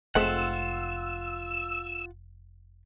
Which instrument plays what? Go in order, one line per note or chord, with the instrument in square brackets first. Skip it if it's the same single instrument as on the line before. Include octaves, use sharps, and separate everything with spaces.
[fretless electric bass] F1 A3 [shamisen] G#3 C4 C5 [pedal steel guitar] F4 F#5 [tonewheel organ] E6